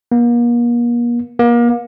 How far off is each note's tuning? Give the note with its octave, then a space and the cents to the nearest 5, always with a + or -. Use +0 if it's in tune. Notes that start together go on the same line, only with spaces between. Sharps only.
A#3 +40
A#3 +35